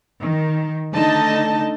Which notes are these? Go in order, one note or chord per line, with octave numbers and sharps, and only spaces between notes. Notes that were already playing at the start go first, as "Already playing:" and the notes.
D#3
D3 A3 D#4 D#5 A5